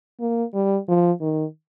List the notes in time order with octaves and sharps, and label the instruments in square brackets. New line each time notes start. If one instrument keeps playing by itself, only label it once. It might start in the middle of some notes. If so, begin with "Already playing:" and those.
[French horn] A#3
G3
F3
D#3